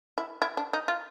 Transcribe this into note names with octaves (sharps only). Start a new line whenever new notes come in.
E4
E4
D4
D#4
F4